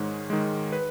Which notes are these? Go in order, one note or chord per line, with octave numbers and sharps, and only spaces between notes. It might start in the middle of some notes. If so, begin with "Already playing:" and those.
Already playing: G#2 D#3 G#3 C#5
D#3 G#3
B4